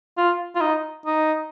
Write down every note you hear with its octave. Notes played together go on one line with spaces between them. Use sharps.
F4
F4
D#4
D#4